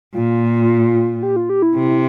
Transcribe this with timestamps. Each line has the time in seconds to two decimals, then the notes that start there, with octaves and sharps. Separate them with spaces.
0.14 A#2 F4
1.23 G4
1.36 F4
1.50 G4
1.62 E4
1.75 C3